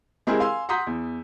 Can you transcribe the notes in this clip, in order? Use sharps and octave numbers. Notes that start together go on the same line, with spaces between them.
G#3 C4 E4 G4 G#4 A#4
F5 G#5 C6 E6
F#5 A#5 C6 D#6 G6 B6
E2